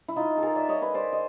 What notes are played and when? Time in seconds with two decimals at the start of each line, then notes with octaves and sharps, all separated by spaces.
0.08 E4
0.16 D#4 F4
0.37 A4
0.43 G#4 A#4
0.56 D5 E5
0.69 C#5 D#5
0.82 B4 C#5
0.94 C5 D5
1.13 D#5